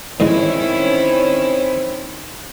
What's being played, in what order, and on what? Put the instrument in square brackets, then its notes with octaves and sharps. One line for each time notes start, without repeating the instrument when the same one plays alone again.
[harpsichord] A#2 E3 G#3 [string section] D#3 C#4 E4 [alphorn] C4